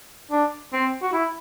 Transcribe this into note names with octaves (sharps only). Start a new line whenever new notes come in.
D4
C4
F#4
E4